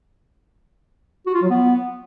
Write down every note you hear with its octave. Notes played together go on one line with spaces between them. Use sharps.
F#4
F4
F#3
B3